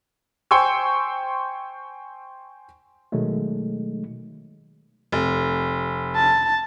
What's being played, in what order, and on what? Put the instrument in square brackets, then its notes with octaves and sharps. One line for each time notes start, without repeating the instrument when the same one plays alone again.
[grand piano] C5 G5 G#5 C6 C#6 E6
[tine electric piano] B2 D#3 F#3 G#3 A3
[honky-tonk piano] F1
[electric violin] A5